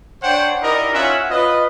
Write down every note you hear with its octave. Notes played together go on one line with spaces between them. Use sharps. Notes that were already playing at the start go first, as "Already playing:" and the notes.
D4 C5 C#5 F#5 G5
D#4 E4 G4 A#4 D5 D#5
C#4 F4 C#5 E5 F#5
F4 B4 D#5